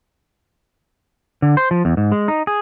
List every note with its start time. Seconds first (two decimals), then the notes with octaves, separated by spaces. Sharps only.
1.42 D3
1.57 C5
1.71 F3
1.85 E2
1.97 G#2
2.12 G#3
2.28 D#4
2.47 G#4